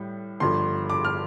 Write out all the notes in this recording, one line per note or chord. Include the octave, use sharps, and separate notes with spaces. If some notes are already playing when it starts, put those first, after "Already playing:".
Already playing: A2 G3
G1 G2 F3 C6
D6
F6